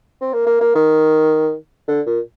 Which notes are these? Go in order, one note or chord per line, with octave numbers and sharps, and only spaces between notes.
C4
A#3
A#3
A#3
D#3
D3
A#2